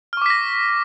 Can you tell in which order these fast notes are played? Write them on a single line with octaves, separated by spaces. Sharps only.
F6 C#6 D6 B6 A#6